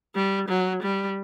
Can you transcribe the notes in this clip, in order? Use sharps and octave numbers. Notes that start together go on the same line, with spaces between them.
G3
F#3
G3